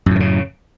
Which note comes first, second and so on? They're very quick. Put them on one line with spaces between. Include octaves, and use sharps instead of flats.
F#2 A2 E3 C#3